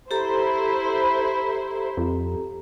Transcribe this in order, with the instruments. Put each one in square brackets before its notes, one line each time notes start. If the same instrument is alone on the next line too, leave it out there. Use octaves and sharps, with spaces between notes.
[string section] E4 C5 [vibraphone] G4 A4 A#5
[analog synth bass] F2